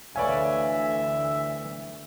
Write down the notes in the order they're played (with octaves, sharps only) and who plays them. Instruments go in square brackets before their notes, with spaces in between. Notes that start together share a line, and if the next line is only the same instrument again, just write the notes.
[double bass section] D2 E3 [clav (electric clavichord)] B4 C#5 F5 [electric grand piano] D5 G#5 [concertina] E5